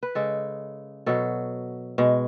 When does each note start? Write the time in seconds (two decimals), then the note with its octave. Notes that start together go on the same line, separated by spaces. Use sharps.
0.03 B4
0.15 C#3 G#3 A4
1.06 B2 F#3 A4
1.98 B2 G#3